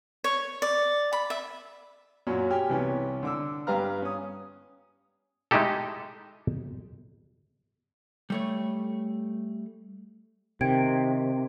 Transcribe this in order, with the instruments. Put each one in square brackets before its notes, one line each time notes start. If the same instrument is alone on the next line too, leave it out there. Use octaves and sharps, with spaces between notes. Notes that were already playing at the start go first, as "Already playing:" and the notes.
[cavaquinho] C#5
D5
B5
E5
[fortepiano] F#2 A#2 C#4 F#4
G4 G5 G#5 F6
C2 E3 B3 C#4 G4
D3 D6 E6
G2 G4 B4 F5 A#5 F6
C#4 D#6
[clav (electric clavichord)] G#3 A3 D#4 E4 G4 A4
[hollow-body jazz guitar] G3 A3 C#5
[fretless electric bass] C3 [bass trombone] D#3 [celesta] G5 G#6 D7